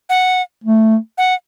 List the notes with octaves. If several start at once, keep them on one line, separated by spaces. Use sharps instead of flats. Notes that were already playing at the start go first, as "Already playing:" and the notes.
F#5
A3
F#5